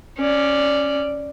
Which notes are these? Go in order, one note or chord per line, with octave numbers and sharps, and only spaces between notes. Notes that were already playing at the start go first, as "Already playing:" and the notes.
C#4 D5